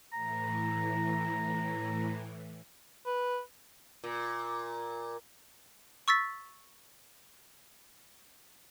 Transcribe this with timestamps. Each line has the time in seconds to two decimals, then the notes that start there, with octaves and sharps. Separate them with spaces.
0.13 A2 E3 A#5
3.06 B4
4.04 A#2
6.08 C#6 E6 A6 B6